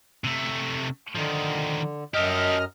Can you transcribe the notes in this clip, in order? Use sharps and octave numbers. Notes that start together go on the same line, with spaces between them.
C3 A3
D3 D#3 F3
F#2 G4 A4 D#5 F6